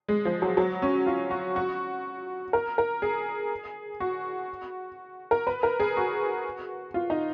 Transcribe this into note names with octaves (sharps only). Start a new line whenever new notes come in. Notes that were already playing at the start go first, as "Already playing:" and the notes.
G#3
F3
F#3
F#3
C#4
F4
F#4
F#4
A#4
A#4
G#4
F#4
A#4
B4
A#4
G#4
F#4
F4
D#4